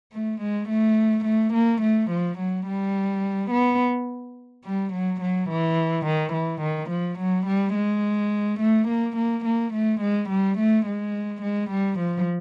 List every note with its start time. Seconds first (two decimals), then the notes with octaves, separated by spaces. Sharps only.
0.13 A3
0.41 G#3
0.69 A3
1.25 A3
1.53 A#3
1.82 A3
2.11 F3
2.38 F#3
2.67 G3
3.51 B3
4.65 G3
4.93 F#3
5.21 F#3
5.50 E3
6.06 D#3
6.33 E3
6.62 D#3
6.90 F3
7.19 F#3
7.47 G3
7.75 G#3
8.60 A3
8.88 A#3
9.17 A#3
9.45 A#3
9.73 A3
10.01 G#3
10.29 G3
10.58 A3
10.86 G#3
11.42 G#3
11.70 G3
11.99 F3